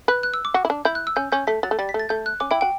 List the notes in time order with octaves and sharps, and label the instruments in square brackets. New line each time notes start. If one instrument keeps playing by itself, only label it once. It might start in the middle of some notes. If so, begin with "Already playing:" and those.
[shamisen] B4 [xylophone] F#6
[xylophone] F#6
E6
D6
[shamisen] F#4
E4
D4
[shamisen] E4 [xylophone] G6
[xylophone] F#6
E6
[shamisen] C#4 [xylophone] G6
[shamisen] C#4 [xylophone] G6
[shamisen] A3 [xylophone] B6
[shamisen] F#3 [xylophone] A6
[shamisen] A3
[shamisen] G3 [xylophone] A6
[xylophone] B6
[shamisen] A3
[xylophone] A6
[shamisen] A3 [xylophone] G6
[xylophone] F#6
[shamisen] C#4 [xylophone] D6
[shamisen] E4 [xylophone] G5
[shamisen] F#4 [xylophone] G5